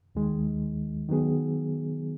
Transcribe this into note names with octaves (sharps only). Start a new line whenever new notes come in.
D#2 D#3 G#3
D#3 F#3 B3 G#4